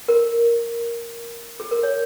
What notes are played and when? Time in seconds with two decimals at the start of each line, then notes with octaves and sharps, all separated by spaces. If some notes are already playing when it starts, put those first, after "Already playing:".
0.08 A#4
1.60 G#4
1.71 A#4
1.83 C#5